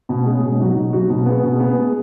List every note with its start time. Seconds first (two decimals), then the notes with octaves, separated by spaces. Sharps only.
0.09 B2
0.26 G#3 C#4
0.42 B2
0.59 F#3 D#4 F#4
0.75 B2
0.93 F#3 D#4 F#4
1.10 B2
1.26 B3 G#4
1.43 B2
1.60 B3 G#4
1.77 G#3